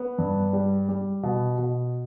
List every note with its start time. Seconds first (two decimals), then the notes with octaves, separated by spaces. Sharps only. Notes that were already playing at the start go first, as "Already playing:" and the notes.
Already playing: B3
0.18 G2
0.53 G3
0.89 G3
1.23 B2
1.58 B2